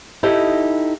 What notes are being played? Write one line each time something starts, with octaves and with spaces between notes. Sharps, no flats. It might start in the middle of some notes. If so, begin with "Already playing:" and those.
D#4 E4 G4 A4 D#5